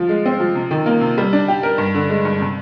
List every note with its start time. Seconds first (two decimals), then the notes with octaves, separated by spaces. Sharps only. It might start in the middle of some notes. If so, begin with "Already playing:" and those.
Already playing: F3 F4
0.09 G#3
0.26 C4
0.40 F3
0.55 C3
0.71 D#3
0.86 A#3
1.01 C3
1.18 G3
1.33 D4
1.48 G4
1.63 A#4
1.78 G2
1.94 D3
2.10 G#3
2.25 G2
2.41 C3